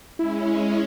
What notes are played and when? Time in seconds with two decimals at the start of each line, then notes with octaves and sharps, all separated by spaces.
0.19 G#3 C#4 E4